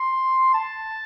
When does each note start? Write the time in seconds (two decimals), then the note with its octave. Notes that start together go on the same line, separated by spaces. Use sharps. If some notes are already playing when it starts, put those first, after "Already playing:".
Already playing: C6
0.54 A5